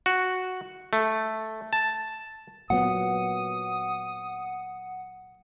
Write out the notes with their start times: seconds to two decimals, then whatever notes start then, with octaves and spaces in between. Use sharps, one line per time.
0.06 F#4
0.93 A3
1.73 A5
2.70 A#2 F#3 B3 F#5 D#6